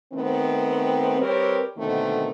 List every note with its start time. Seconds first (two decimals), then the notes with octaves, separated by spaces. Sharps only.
0.13 D#3 A3 B3 C4
1.20 G3 C4 G4 A#4 B4 C#5
1.77 B2 D3 D#3 A3 A#3 C4